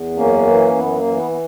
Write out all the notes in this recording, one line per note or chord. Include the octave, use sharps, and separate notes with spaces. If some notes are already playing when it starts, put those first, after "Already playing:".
Already playing: E2
F#2 A#3 C#4
E3
F#2 B3
A#3
E3
B3
B3